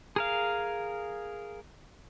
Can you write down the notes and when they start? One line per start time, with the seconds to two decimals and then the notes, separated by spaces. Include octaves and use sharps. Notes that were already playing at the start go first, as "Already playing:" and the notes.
0.16 G#4 A#4 F5